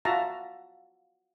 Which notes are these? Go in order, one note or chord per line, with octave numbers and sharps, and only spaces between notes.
F4 F#4 E5 A5 A#5